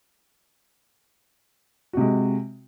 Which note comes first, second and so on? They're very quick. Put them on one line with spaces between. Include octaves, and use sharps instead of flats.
F#4 C3 G#3